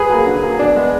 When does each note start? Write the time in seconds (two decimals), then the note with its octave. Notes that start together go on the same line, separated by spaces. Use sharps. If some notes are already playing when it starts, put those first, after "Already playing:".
Already playing: G#4 B4
0.10 F#3 A#3
0.26 D3
0.43 F#3 A#3
0.59 B2 D4
0.76 G#3 B3